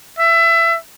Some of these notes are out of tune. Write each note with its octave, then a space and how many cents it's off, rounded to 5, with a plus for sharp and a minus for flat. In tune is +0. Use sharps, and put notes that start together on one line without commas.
E5 +20